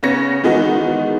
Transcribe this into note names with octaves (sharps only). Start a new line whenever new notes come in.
C#3 B3 C#5 A#6 C#7
D#3 E3 G#3 B3 D#4 F#4